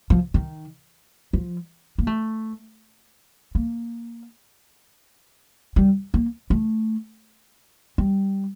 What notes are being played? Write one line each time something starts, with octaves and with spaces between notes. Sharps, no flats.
F3
D#3
F3
A#3
A3
A#3
G3
A#3
A3
G3